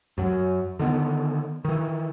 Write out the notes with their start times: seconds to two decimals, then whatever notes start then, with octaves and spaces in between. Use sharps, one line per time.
0.18 F#2 F#3
0.79 D3 D#3 B3
1.65 D#3 E3